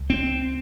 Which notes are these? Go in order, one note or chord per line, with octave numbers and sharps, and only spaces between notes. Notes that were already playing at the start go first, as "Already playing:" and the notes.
Already playing: C#2
C4